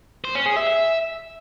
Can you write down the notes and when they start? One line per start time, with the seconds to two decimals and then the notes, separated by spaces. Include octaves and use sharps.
0.24 C5
0.35 C#4
0.46 G#4
0.56 E5
0.67 E5